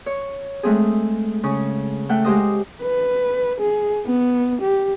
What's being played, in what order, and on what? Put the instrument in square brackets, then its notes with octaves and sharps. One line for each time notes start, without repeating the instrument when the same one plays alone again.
[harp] C#5
G#3 A3 C4 G#4
C#3 C#4
A3 F#5 G5 F#6
G#3 G4 C5 D#5
[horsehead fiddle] B4
G#4
B3
G4